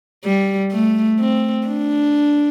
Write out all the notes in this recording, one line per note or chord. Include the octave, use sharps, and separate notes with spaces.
G3
A3
C4
D4